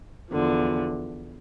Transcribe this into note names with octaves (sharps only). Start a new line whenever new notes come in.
E2 D3 F3